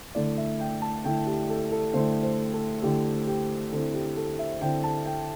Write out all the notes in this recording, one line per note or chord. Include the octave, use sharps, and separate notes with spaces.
D3 A3 E4 D5
E5
G5
A5
D3 A3 E4 G5
G4
A4
A4
D3 A3 E4 C5
C5
A4
D3 A3 E4 G4
G4
D3 C4 E4 A4
G4
A4
E5
D3 C4 E4 G5
A5
G5